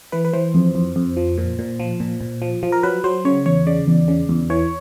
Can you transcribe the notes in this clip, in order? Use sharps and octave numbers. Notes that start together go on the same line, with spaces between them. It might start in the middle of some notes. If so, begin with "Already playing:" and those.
E3 B4
B4
E3 C5
F2
F2
F2
F3
A#2
A#2
F3
A#2
A#2
F3
F3
A#4
F#3 B4
F#3 C5
C#3 C#5
E2 C#5
C#3 D5
E2
C#3
E2
E3 C#5